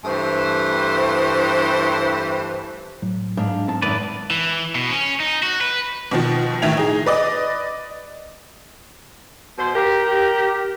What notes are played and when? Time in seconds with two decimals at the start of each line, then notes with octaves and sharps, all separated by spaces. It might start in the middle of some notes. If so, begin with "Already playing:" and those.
0.04 G2 E3 A3 C5
3.02 A2 F#3
3.37 G#2 G#3 D4 F5
3.68 C4 D#4 A5
3.82 F#2 A2 D#3 G#3 B4 D5
4.31 E3
4.75 B2
4.90 C#4
5.20 D#4
5.43 F#4
5.61 B4
6.11 B2 D#3 F3
6.62 A#1 A2 D#3 E5 G#6 F7
6.77 D#4 G#4
7.06 B4 D5 D#5
9.58 B2 C5
9.75 G4 A#4